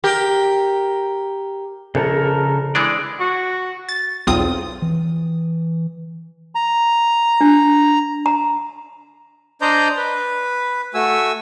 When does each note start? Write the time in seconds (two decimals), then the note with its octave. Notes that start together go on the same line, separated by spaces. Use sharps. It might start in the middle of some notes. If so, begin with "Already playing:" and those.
0.04 G4 A#4
1.95 A#1 C#3 A4 A#4
2.75 E3 G#3 D4 D5
3.20 F#4
3.89 A6
4.27 B1 E2 C4 F4 D#6
4.82 E3
6.55 A#5
7.41 D4
8.26 A#5
9.61 D4 C5 D5 D#5 A#5 G6
9.97 B4
10.94 A3 F#4 G#5 E6